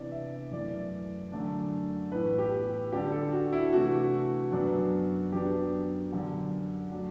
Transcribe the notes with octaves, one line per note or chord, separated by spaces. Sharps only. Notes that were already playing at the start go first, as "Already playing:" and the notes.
Already playing: C3 E3 B3 D4 D5
E5
F#2 E3 A3 D5
F#2 D3 A3 D4
A2 E3 B3 B4
G4
D3 G3 D4 G4
A4
F#4
E4
C3 E3 A3 D4 F#4
F#2 F#3 B3 D4
F#2 F#3 B3 D4 G4
F#2 D3 G3
F#3 A3 D4